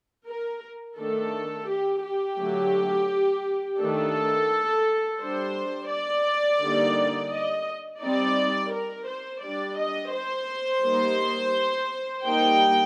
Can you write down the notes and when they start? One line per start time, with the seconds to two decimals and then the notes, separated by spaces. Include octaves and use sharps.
0.28 A#4
0.98 D#3 A3 D4 A4
1.69 G4
2.04 G4
2.39 D3 F#3 A3
3.80 D#3 A3 D4 A4
5.21 G3 D4 C5
5.91 D5
6.62 D3 G3 A#3 D#4
7.32 D#5
8.02 G3 C4 D#4 D5
8.73 A#4
9.09 C5
9.43 G3 D4 D5
9.79 D#5
10.13 C5
10.85 G3 A#3 D#4
12.25 G3 A#3 D#4 G5